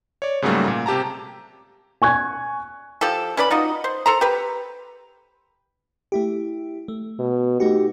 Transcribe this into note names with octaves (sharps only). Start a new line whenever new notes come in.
C#5 D5
G#2 C#3 F#3 G3 A3 A#3
A#2
C3 G4 A5 A#5
G#5 C#6 F#6 G#6
F3 G4 A4
C#4 B4 D5 B5
D#4 F4 F#4 D#5
C5
A4 C5 A#5
G4 B4
A3 E4 G4
A3
B2
A3 D#4 F#4 G4